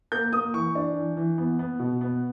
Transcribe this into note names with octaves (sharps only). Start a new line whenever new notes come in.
A#3 G6
A#3 D#6
E3 C#6
D4
E3
E3
B3
B3
B2
B3